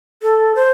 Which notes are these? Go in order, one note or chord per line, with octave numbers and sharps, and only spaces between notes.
A4
C5